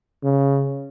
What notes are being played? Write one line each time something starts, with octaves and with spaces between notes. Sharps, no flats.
C#3